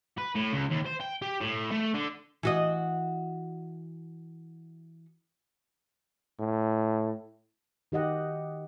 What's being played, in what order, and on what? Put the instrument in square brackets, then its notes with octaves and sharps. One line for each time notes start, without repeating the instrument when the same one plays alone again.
[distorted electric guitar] B4
A2
C#2
D#2
C5
G5
G4
A2
A3
D3
[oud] E3 F#4 D#5
[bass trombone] A2
[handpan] D#3 G4 D#5 F#5